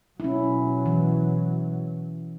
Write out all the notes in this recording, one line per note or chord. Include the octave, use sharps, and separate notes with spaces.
B2 F#3 C#4 E4
E3